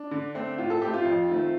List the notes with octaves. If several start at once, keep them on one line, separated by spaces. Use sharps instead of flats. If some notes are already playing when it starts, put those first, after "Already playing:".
Already playing: D4
D3
A3 C4
A2 F4
A4
A3 C4 G4
F4
F2
D#3 A3 C4